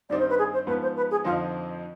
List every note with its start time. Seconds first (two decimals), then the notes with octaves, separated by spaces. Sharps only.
0.09 G2 D#3 G3 C4 D#4 D5
0.18 C5
0.29 B4
0.38 G#4
0.53 C5
0.67 G#2 F3 B3 B4
0.82 C5
0.96 B4
1.10 G#4
1.24 F2 D3 F3 C4 D#4 F4